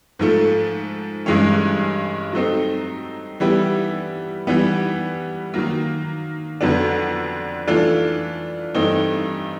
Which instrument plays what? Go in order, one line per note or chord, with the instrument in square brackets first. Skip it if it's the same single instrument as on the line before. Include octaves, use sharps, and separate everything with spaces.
[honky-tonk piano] G#2 F3 A3
G2 E3 G#3 C#4
F#3 A3 C4 D#4
E3 G3 B3 E4 G4
E3 G3 B3
D#3 F#3 A#3
F2 D3 F#3 B3 D4
E3 A3 D4 F4
G2 E3 A3 C4 D#4